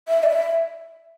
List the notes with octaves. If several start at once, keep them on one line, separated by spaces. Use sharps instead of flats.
E5
D5
E5